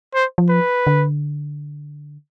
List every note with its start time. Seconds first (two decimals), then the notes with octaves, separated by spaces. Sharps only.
0.14 C5
0.38 F3
0.50 B4
0.87 D3